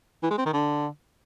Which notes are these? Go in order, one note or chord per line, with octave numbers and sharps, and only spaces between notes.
E3
G#3
C4
D#3
D3